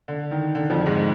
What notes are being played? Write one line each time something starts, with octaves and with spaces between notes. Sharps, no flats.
D3
D#3
D3
F2 F3
G#2 G#3